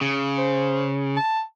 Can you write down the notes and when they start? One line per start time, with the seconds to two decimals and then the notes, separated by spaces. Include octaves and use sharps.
0.01 C#3
0.38 C5
1.16 A5